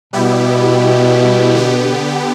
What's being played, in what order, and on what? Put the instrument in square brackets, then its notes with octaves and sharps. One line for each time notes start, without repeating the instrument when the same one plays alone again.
[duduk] B2 [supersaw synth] G3 B3 E4 G4
[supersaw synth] D3 B3 G4